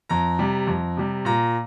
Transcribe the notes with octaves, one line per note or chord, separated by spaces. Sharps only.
F2 A#5
C3 G3
F2
C3 G3
A#2 A#5